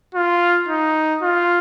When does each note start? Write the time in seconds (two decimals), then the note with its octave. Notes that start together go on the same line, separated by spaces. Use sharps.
0.15 F4
0.68 D#4
1.23 F4